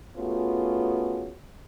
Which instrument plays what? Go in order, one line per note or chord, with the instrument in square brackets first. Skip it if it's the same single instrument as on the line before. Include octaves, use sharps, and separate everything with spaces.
[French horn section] A3 B3 C#4 F4 F#4 G#4